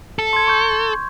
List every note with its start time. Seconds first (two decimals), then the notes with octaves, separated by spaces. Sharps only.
0.19 A4
0.33 C6 G#6
0.47 C#6 G6